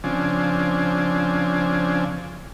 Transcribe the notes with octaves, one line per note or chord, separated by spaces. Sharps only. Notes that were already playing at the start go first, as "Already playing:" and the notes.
C#3 F3 C4 D4 G#5